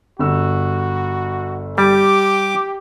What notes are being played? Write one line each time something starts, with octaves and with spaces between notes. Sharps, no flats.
G1 F#4 E6
G3 G4 D6